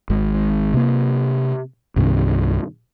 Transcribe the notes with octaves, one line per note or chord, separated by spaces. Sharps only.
G#1 G#2
C3 A#3
C2 G2 C3 D#3